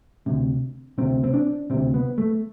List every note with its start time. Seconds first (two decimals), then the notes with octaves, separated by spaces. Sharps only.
0.26 D2 C3
0.98 D2 C3 C4
1.24 C4
1.34 D4
1.70 D2 C3 C4
1.94 B3
2.18 A3